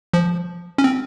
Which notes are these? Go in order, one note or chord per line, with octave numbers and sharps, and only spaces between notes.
F3
C#4
C4